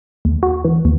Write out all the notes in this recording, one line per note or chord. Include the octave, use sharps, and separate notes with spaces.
D#2
F#4
E3
D#2